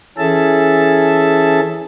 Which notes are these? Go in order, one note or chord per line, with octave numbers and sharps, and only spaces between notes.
E3 C#4 G#4 A4 E5 A5